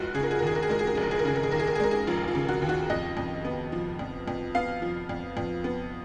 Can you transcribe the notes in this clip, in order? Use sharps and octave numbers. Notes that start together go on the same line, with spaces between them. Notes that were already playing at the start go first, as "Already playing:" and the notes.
Already playing: F1 G#3 F4 F#4
C#3 G#4
A#4
G#4
A#4
D#2 G#4
A#4
G#4
G#3 A#4
G#4
A#4
F1 G#4
A#4
G#4
A#4
C#3 G#4
A#4
G#4
D#2 A#4
G#4
A#4
G#4
G#3 A#4
G#4
F1 F4
F4
C#3
F#4
D#2
F#4
F2 D#5
F2
B3
F3
F2
F2
B3 F5
F3
F2
F2
B3